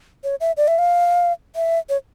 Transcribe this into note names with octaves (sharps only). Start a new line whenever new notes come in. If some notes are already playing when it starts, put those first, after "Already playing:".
C#5
E5
D5
E5
F5
E5
C#5